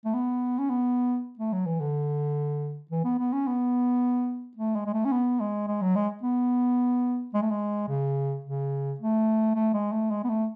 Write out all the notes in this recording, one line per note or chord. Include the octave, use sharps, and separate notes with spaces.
A3
B3
C#4
B3
A3
F#3
E3
D3
E3
B3
B3
C#4
B3
A3
G#3
G#3
A3
C#4
B3
G#3
G#3
F#3
G#3
B3
G#3
A3
G#3
C#3
C#3
A3
A3
G#3
A3
G#3
B3
A3